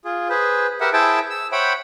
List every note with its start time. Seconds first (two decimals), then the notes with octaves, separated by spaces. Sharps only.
0.05 F4 G#4
0.29 G#4 B4 C5
0.81 G4 A#4 B4 E5 F#5
0.93 E4 G#4 C5 E5 G5 A5
1.30 E6
1.52 C5 C#5 E5 F#5 G5 B5